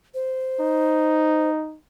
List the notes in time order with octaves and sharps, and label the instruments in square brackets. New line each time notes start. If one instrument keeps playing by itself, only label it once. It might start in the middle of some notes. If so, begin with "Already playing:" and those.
[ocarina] C5
[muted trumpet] D#4